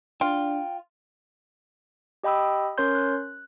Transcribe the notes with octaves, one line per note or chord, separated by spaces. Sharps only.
D4 F4 G5
G4 D#5 G5 B5 D#6 E6
C#4 A#4 C#5 C6 G6
F#6